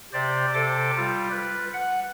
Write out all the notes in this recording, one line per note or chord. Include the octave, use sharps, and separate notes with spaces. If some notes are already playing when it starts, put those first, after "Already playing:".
C3 G4 C5 D5
C3 A4 C5 D6
G3 F4
B4
F#5